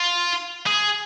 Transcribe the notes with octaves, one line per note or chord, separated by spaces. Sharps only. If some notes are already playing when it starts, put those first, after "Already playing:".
Already playing: F4
G#4